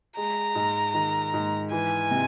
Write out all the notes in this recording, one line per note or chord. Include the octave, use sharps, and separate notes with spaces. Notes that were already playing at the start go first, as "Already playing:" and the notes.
G#3 A#5
G#2
D#3
G#2
E3 G#5
C3